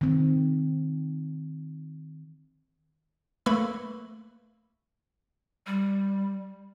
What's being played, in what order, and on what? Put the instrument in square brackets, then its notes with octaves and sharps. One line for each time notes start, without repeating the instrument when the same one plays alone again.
[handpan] D#3 C4
[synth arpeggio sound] A3 A#3 B4 B5 C#6 E6
[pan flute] G3